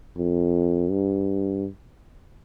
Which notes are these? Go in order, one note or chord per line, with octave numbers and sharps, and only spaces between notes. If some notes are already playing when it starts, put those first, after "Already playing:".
F2
G2